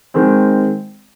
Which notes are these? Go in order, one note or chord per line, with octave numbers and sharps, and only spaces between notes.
D#3 G#3 C4